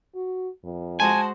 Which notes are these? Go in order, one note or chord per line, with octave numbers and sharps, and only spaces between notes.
F#4
F2
G#3 F#4 C5 G#5 A5